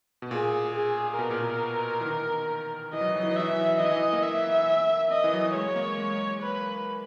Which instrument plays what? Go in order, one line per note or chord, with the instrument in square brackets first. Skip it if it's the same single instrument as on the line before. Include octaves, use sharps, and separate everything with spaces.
[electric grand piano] B2
[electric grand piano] A#2 [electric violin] G#4
[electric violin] G#4
[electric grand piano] B2 [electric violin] A#4
[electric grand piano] A#2
B2
E3
D#3
[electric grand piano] E3 [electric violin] D#5
[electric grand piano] F#3
E3
F#3
E3
F#3
[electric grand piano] E3 [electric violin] E5
[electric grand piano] E3 [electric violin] D#5
[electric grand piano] E3
A#3
[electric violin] E5
D#5
[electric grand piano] E3
F#3
[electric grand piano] G#3 [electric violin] C#5
[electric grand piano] G#3
A#3
G#3
[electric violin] B4